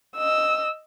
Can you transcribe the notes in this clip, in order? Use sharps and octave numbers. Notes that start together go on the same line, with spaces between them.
D#5 E6